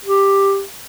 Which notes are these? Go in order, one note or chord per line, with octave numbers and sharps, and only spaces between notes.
G4